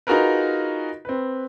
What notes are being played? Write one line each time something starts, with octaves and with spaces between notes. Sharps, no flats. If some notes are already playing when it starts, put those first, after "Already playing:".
D#4 F4 F#4 G#4 A#4 B4
C4 B4